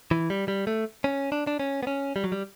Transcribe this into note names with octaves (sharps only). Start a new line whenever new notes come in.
E3
G3
G3
A3
C#4
D4
D4
C#4
B3
C#4
G3
F#3
G3